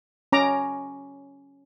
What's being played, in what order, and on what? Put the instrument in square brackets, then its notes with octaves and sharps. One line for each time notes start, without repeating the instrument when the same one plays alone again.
[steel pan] C#4 A#5 D6